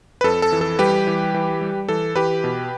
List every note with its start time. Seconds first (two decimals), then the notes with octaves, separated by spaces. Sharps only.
0.21 B4
0.24 F2 A4
0.42 A4
0.52 E3
0.61 A4
0.79 G3 G4 B4
1.07 E3
1.34 E3
1.61 G3
1.89 E3 A4
2.15 E3 G4 B4
2.44 B2